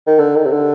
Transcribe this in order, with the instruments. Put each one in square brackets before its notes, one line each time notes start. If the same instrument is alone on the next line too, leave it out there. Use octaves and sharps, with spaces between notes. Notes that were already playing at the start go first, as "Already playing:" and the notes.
[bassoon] D#3
D3
D#3
C3
D3